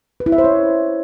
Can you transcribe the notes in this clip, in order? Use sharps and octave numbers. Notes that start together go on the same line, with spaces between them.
B4
E4
E5
C5
C#5